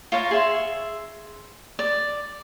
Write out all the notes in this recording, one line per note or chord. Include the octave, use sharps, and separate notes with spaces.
F4 C#5 F5 A#5
G#4 E5 C6
D5